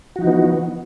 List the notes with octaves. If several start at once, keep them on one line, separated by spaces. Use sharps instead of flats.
E3 F3 B3 D#4 F#4